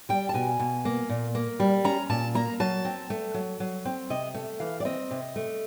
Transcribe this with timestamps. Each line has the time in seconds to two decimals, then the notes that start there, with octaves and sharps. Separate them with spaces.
0.09 G3 G5
0.29 A5
0.34 B2 G#5
0.59 B2
0.85 A#3
1.09 A#2
1.35 A#3
1.60 G3
1.84 C#4 A#5
2.10 A#2 A5
2.35 A#3 A#5
2.60 F#3 A5
2.85 C4
3.10 A3
3.34 F#3
3.60 F#3
3.85 C4
4.10 C3 D#5
4.34 A3
4.60 E3 F5
4.80 D5
4.85 C4 D#5
5.11 C3
5.36 A3